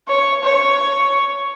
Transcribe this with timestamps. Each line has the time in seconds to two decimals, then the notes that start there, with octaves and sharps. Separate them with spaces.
0.08 C#5
0.44 C#5